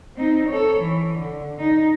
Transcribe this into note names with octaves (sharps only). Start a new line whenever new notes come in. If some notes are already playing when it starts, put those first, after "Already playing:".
C4 D#4
A4 C#5
E3
D3
D#4